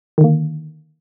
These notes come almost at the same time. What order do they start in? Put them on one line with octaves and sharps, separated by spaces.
D#3 D3 A#3